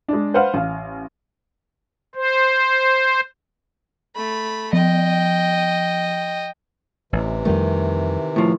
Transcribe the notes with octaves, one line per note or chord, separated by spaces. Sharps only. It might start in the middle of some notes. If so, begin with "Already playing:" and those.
G#3 D4
B4 C5 F5 F#5 F6
A1 F5
C5
A3 B5
F3 D#5 G5
A1 C3 E3
F2 D#3 G3 A3
A2 F3